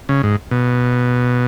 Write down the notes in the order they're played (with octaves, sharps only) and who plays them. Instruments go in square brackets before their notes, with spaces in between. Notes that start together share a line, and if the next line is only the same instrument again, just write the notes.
[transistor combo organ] C#3
G#2
B2